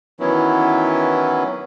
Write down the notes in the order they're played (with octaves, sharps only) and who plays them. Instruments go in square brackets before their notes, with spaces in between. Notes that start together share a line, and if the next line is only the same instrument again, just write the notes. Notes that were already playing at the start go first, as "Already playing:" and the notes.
[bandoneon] D#3 E3 F#3 B3 C#4 E4